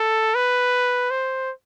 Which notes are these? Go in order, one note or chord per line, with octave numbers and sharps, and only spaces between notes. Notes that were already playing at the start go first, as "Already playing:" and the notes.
Already playing: A4
B4
C5